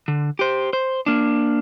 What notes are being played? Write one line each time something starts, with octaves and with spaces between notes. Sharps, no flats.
D3
G4 C5
C5
A#3 D4